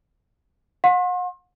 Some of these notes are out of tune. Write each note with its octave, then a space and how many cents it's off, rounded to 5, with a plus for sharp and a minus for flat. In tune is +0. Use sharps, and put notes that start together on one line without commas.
F#5 -45 C6 +40